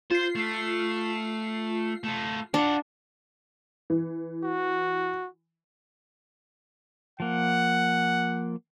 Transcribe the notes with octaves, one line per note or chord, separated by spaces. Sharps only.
F4 C5 C7
A3
A3 F4
D4 F4 F#5
E3
F#4
F3 A#3 F#5